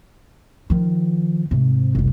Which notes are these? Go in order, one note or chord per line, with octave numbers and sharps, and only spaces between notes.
D#3 F3
G#2 C3
F#1 C2